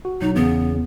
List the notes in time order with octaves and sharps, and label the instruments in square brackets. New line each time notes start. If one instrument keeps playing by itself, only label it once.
[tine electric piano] F#4
[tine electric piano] B1 F#3 [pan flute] D#4
[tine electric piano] E2 C#3 [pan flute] B3